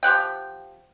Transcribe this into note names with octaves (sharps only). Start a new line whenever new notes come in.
F3 G4 F#5 G5